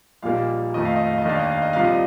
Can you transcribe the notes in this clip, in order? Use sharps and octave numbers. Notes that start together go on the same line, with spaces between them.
A#1 A#2 G3 A#3 D#4 F5
F2 D#3 A3 D#5
F5
D#5
F5
D#5
D#2 D#3 A#3 D4 F5
D#5
F5
D#5
C2 C3 F3 F5
D#5